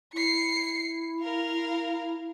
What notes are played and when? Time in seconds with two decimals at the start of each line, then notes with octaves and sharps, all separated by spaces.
0.13 E4 C7 C#7
1.21 A#4 F5